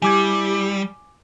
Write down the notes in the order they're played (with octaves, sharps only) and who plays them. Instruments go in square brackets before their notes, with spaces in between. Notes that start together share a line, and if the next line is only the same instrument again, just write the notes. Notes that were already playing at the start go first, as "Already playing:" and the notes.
[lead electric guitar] G3 [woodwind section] E4 G4 [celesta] G#5 D6 G#6